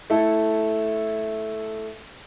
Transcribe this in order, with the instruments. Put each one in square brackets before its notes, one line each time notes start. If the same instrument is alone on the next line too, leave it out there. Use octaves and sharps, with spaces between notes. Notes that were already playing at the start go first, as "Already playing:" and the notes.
[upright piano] A3 E4 A4